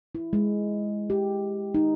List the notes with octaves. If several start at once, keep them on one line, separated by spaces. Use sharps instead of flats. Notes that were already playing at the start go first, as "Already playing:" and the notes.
E4
G#3
G4
D#4